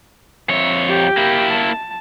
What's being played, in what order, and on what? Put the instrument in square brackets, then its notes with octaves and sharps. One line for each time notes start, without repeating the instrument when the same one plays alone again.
[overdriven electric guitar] F2 C#5 [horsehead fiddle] E5
[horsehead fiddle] G4 G5
[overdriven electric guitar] A#3 E4
[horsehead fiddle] A5